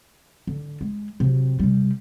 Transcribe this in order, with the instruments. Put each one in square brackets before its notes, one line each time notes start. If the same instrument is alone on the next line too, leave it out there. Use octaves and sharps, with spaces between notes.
[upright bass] D3
G#3
C3 F#3
C3 G3